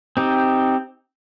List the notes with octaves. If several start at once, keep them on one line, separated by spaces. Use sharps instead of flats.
C4 D#4 G4